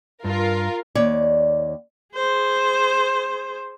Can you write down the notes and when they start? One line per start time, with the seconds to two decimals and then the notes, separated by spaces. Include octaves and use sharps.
0.24 G2 F4 A#4
0.95 D#2 C#5 D5
2.15 G#4 C5